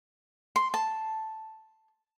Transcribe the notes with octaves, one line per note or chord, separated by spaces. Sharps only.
C6
A5